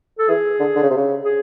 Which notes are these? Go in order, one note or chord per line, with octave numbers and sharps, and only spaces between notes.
A4
E3 G#4
D3
D3
C#3
C3
C#3
G#4